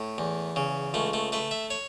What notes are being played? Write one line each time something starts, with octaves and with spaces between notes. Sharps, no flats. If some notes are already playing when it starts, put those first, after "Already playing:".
Already playing: A2
E2
C#3
C#2 A3
A3
A3 B4
E5
C#5